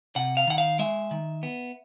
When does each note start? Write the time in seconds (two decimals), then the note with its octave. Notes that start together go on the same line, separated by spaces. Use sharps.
0.16 C3 F#5
0.37 F5
0.47 D#3 F#5
0.58 F5
0.79 G#3 E5
1.11 D#3
1.43 B3